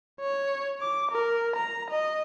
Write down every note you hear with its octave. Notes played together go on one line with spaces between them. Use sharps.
C#5
D6
A#4
A#5
D#5